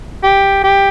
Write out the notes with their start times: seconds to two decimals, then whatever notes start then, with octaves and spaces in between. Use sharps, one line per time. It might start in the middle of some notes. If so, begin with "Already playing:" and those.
0.23 G4
0.63 G4